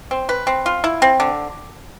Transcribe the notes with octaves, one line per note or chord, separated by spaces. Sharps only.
C4
B4
C4
F4
E4
C4
D3